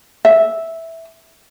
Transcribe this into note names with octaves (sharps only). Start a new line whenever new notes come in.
E5